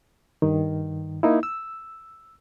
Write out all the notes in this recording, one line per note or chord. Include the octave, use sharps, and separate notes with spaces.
G2 D#3
A#3 D#4 E4
E6